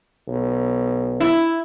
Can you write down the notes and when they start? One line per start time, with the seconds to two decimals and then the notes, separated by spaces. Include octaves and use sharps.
0.28 B1
1.20 E4